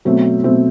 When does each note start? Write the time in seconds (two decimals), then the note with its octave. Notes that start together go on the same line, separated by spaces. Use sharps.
0.05 B2 F#3 A3 C4
0.44 B2 F#3 A3 C4